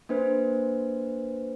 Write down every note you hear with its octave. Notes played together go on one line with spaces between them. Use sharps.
A#3 D4 B4 C5